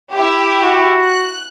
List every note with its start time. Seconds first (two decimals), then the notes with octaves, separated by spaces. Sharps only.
0.12 E4 G4
0.62 F#4
1.03 F#6